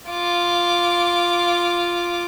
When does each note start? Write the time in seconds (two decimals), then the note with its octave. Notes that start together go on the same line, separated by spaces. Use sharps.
0.10 F4 D6